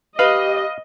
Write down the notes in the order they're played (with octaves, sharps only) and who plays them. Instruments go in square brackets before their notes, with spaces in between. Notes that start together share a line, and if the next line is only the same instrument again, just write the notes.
[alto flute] G4 [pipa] B4 [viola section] D#5 [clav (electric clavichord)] F5